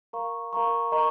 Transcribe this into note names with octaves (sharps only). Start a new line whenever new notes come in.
A#4 F5 A#5 C#6
A#4 F5 A#5 C#6
A#4 D#5 A#5 C#6